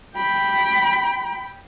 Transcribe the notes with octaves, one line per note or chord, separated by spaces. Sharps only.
G5 B5